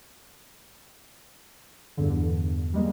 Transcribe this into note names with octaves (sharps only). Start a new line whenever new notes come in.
E2 G2 D3
G3 G#3 A#3